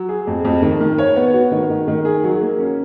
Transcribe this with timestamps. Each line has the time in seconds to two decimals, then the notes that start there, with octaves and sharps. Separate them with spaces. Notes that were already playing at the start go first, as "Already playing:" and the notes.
Already playing: F#3
0.09 G#4
0.27 F2
0.45 F2
0.62 D#3
0.80 D#3
0.98 C#5
1.16 B3
1.34 F#4
1.52 D#3
1.70 D#3
1.88 D#3
2.05 G#4
2.24 F#3
2.41 A#3
2.58 C#4